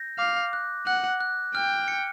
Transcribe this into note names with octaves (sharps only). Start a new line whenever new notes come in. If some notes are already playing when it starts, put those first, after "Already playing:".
Already playing: G6 A#6
F5 D6
F#6
F#5 F#6
F#6
G5 F6
C#7